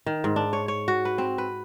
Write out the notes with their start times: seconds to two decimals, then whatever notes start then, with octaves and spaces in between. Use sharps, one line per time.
0.06 D#3
0.24 G#2
0.36 D4
0.53 C#5
0.68 C#5
0.88 F#4
1.05 B4
1.18 C4
1.38 B4